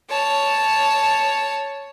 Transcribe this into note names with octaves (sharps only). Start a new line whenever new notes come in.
C#5 A5